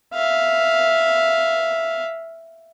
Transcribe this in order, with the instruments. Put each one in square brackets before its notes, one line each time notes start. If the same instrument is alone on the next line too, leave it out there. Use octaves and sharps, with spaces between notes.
[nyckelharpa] E5 F5